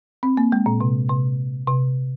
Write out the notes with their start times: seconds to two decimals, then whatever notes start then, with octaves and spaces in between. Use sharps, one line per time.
0.23 C4
0.37 A#3
0.52 G#3
0.66 A#2
0.81 C3
1.09 C3
1.67 C3